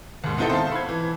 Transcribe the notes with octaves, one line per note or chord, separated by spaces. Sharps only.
D#2 G#2
B3 C4 D#4 E4 A4
C5 E5 F5 A5
B5 G#6
E3